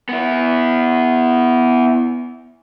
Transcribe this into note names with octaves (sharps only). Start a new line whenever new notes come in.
B3 E4